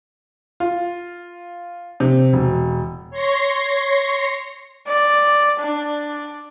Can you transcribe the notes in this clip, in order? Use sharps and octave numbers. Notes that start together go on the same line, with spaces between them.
F4
C3
E1
C#5 C6 C#6 A#6 C7
D5
D4